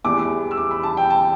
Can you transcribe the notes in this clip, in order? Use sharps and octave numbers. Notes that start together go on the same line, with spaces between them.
E2 E3 G3 D6
E6
D6
B5
A5
G5
A5